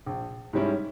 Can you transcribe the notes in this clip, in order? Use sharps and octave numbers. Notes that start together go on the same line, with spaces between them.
A#1
G#2 G3 C#4 E4